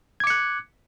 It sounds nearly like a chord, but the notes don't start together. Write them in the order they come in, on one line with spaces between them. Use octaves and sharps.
G#6 D6 C#7 F#6